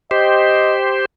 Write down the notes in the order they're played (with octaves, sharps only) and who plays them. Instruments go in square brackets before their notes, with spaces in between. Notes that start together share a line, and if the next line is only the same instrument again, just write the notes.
[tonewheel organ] G4 C5 [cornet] D#5